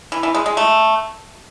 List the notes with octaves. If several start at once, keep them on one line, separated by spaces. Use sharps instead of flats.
E3
E3
G#3
G#3
A3